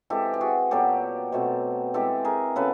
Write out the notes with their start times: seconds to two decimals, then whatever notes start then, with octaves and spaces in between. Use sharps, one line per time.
0.10 E3 G#3 C4 G4 A4
0.34 G4
0.41 F#4 G#4
0.71 A#2 F#3 B3 G4 A4
1.32 B2 F#3 A3 C4
1.94 E3 G#3 C4 G4 A4
2.25 G#4 A#4
2.56 C#3 F#3 B3 A4 B4